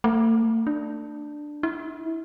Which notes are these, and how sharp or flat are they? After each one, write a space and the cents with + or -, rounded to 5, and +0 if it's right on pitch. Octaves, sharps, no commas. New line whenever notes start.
A3 +40
D4 +10
E4 -25